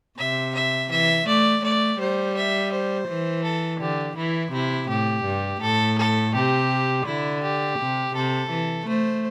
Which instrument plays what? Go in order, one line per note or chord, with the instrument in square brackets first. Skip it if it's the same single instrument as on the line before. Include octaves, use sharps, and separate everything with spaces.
[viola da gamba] C3 [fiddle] E5
[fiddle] E5
[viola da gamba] E3 [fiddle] E5
[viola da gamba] A3 [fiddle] D5
[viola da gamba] A3 [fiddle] D5
[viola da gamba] G3 [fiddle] C5
[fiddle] E5
C5
[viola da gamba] E3
[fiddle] A4
[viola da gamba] D3 [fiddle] G4
[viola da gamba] E3 [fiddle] E4
[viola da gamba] C3 [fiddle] E4
[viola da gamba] A2 [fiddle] G4
[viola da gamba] G2
[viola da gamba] A2 [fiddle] A4
[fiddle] A4
[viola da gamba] C3 [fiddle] G4
[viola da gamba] D3 [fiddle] E4
[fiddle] G4
[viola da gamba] C3
[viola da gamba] C3 [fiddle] A4
[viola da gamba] E3
[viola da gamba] A3 [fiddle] C5